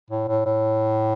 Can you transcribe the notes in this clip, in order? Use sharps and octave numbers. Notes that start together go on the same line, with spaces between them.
A2
A2
A2